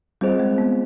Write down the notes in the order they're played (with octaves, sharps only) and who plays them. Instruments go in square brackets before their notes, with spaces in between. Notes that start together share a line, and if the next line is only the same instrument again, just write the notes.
[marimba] G3 [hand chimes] C4 F4 G#4 C5 D#5
[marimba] G#3
B3